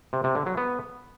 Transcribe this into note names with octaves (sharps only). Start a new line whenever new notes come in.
C3
C3
D3
F#3
B3